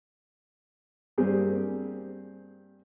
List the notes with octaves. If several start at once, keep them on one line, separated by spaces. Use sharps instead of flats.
G2 A#3 C4 G4 G#4